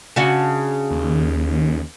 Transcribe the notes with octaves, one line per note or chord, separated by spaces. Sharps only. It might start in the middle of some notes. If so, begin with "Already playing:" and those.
C#3 D4 F#4
D#2